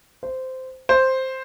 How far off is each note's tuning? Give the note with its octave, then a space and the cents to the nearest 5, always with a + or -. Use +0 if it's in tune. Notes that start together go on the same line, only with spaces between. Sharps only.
C5 -15
C5 +0